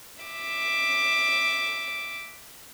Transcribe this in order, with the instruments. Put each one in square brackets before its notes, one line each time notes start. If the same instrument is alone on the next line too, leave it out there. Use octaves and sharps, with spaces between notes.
[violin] E5 D6